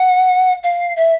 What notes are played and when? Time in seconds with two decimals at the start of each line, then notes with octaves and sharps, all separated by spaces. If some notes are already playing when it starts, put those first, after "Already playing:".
Already playing: F#5
0.63 F5
0.96 E5